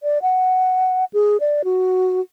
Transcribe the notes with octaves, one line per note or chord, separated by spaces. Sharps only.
D5
F#5
G#4
D5
F#4